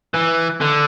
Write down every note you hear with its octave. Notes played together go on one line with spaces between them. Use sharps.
E3
D3